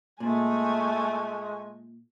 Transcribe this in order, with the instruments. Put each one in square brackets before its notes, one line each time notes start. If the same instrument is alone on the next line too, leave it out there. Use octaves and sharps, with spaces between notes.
[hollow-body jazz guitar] A#2 [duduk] G#3 [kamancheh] A3 G#5